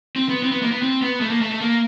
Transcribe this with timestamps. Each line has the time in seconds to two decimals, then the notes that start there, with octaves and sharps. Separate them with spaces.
0.16 C4
0.29 B3
0.43 C4
0.51 B3
0.62 A#3
0.71 B3
0.82 C4
1.02 B3
1.21 A3
1.30 A#3
1.41 A3
1.51 A3
1.61 A#3